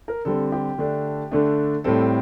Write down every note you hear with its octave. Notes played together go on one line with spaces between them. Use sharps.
A#4
D3 G3 C4 A4
G4
D3 A3 D4
D3 A3 D4
A2 G3 C4 A4